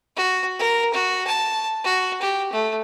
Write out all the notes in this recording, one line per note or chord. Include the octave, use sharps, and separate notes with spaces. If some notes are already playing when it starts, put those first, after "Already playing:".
F#4
A#4
F#4
A5
F#4
G4
A3